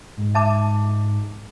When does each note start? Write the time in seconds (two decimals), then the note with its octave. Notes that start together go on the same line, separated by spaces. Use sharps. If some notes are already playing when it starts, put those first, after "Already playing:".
0.17 G#2
0.35 E5 A5 D6